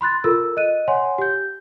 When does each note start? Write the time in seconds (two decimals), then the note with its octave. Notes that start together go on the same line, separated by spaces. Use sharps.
0.01 B5 C6 F#6 A6
0.24 F4 A4 A#4 E6
0.57 D#5 F#6 D#7
0.88 C#5 F#5 G#5 C6
1.18 G4 G6